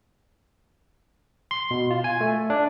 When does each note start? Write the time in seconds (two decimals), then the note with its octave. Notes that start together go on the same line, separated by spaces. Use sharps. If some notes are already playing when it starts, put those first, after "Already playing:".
1.51 C6
1.71 B2
1.91 F4
2.04 G#5
2.21 A3
2.50 D4